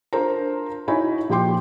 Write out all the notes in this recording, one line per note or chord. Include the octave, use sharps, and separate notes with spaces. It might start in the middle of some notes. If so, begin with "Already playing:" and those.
D4 F4 A#4 C5 A#5
D#4 E4 F#4 C#5 G#5 B5
A#2 F3 G4 G5 C6 D6